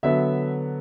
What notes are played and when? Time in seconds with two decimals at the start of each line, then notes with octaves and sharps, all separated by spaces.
0.03 D3 F#3 B3 E5